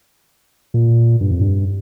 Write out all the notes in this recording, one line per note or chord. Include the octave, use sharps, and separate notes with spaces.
A#2
G2
F2
G2